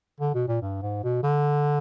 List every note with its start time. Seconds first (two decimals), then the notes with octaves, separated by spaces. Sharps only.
0.20 D3
0.34 B2
0.48 A#2
0.62 G2
0.82 G#2
1.04 B2
1.23 D3